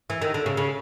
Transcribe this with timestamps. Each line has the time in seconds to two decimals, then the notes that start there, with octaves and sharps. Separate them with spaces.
0.10 E3
0.22 D#3
0.34 D3
0.46 C#3
0.57 C#3